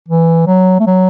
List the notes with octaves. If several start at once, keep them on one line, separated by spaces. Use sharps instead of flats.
E3
F#3
A3
F#3